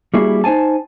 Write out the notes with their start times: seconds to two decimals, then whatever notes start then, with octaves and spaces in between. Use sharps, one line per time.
0.14 G3 A#3 E4 F#4 G#4
0.44 D#4 C5 G#5 A5